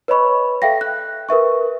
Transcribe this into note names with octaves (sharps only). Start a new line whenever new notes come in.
B4 C#5 D#5 B5 C#6
A4 E5 F5 G5 A#6
F#6
A#4 B4 E5 C#6